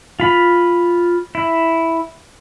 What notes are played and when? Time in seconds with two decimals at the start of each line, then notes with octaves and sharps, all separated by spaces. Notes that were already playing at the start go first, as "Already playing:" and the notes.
0.20 F4 B5
1.35 E4